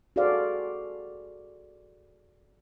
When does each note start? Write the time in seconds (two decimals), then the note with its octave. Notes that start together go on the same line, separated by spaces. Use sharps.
0.16 F#4 G#4 A4 C5 D5 F5